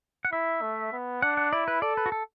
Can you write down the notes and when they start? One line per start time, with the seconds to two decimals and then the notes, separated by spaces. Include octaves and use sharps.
0.25 F#5
0.32 E4 E5
0.62 A3
0.92 B3
1.22 D4 F#5
1.37 F#5
1.53 E4 D5
1.68 B4
1.82 A4 D5
1.97 B4
2.06 F#4
2.12 A4